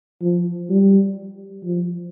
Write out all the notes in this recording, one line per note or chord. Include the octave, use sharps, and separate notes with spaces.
F3
G3
F3